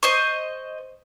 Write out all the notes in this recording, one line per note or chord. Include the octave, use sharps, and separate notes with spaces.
C5 D#5 C#6